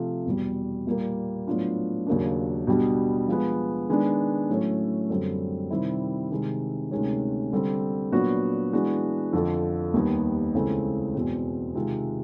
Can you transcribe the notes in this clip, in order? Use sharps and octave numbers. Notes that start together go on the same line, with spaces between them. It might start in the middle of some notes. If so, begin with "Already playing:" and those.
Already playing: C3 F3 A3
E2 B2 G3
A#2 G3 A#3
A2 F#3 B3 D4 F4
D#2 C#3 F#3 A#3 D4
B2 G3 B3 D4 G4
F3 G#3 B3
D#3 G#3 B3 D4
A2 F#3 A3 C#4
F#2 D3 G3 C4
C3 D#3 G3 C4 E4
C3 D#3 G#3 C4
D2 C3 D#3 G#3 C#4
D3 G3 C4
A#2 F#3 B3 D4 F#4
E3 G#3 B3 D4 F#4
F2 D3 F3
D#2 D#3 G3 B3
C#2 C#3 E3 A3 C4
E2 B2 G#3 C4
C3 D#3 G#3 C4 F4